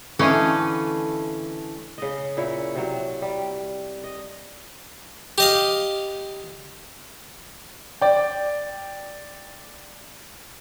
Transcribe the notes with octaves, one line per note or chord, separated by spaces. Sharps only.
D3 E3 A3 C#4 D#5 F5
C#3 D#5
A#2 E4 C#5
C3 F#3
G3
D#5
G4 D#5 F5
D5 G5